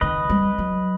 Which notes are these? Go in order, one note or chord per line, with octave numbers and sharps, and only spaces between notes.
D#3 B4 D#5
G3
F#3